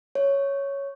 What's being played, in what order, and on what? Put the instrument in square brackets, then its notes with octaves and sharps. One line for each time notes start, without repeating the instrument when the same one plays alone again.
[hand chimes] C#5